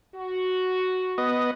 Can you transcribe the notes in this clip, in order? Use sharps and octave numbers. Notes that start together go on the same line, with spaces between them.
F#4
B3 D#5